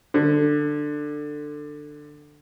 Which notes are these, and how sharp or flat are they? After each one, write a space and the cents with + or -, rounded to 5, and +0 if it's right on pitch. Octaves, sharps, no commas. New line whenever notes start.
D3 +15